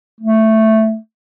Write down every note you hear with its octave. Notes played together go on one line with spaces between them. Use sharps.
A3